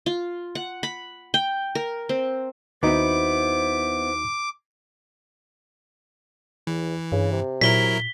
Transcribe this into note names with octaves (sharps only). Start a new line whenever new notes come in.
F4
F#5
B5
G5
A#4
C4
D#2 B3 C4 D#4 E4 F#4 C5 D6
E2 E3
G2 C#3
C3
A#2 F#3 E4 A#4 B6 G7